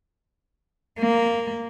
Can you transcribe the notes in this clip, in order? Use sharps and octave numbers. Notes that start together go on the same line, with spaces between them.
A#3